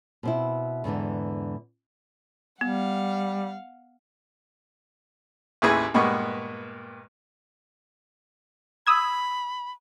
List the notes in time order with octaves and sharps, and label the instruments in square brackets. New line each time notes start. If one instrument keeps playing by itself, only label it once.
[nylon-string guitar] B2 C4 E4
E2 G#2 D3 E3
[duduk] G3 [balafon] B3 [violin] F5 F#5
[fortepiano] A1 D#2 E4 G#4 B4 G#5
G2 A#2 G#3 B3 B5 C#6
[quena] B5 [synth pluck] D#6 E6 G#6